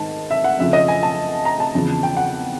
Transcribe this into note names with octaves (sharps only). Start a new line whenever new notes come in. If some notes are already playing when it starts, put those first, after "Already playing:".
Already playing: G#2 D#3 A5
E5
F#5
F2 C#3 F3 E5
D#5
G#5
A5
A#5
A5
E2 C#3 F3
G5
F#5